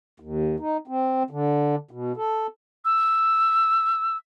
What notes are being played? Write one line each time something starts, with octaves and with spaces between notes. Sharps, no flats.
D#2
D#4
C4
D3
B2
A4
E6